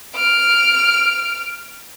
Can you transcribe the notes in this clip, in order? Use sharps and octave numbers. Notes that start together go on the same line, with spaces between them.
F6 D7